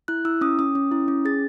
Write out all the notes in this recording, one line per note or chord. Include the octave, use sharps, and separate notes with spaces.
E4 F#6
E4 E6
C#4 D#6
C#4 D#6
C#4
E4
C#4
G#4 A6